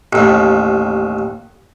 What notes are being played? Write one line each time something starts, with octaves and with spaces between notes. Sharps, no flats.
A1 D#2